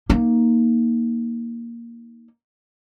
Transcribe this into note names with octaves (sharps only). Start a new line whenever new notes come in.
A#3 D#4